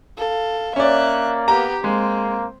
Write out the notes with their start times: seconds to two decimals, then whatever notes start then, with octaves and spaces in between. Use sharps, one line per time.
0.17 A4 F5
0.76 A#3 C#4 D5 E5 F#6
1.48 B3 G4 A#5
1.84 G#3 A#3 C4